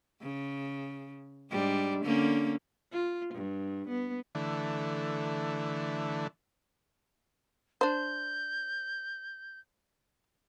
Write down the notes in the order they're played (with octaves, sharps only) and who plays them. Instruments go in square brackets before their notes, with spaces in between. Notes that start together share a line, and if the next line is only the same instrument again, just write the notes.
[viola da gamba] C#3
G#2 G3 D4
D3 A#3 C#4
F4
G2
B3
[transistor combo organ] D3 E3 A3
[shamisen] D4 C5 [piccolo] G6